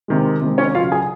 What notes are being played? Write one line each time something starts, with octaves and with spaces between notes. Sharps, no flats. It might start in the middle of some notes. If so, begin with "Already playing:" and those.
C3 D#3 G#3
C3 D#3 G#3
C#4 C#5
C#3 F#3 F4 F5
G#4 G#5